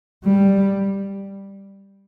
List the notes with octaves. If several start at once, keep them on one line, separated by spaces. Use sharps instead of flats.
G3